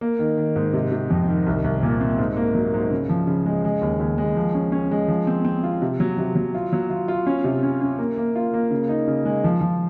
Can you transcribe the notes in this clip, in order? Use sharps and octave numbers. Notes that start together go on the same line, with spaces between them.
A#3
D#3
D#3
G#2
C3
C3
F2
D#3
C2
C2
A#2
C4
G#2
A#3
F#3
G#2
C#3
F3
C#3
G#3
G#3
D#2
D#2
G#3
F3
C#4
C#4
G#3
F3
C4
C4
F4
C3
F#3
C3
F#3
F4
F#3
F4
F4
C#4
C3
C#4
C#4
A#3
A#3
F4
A#3
C#3
D#4
C#3
G#3
F3
F3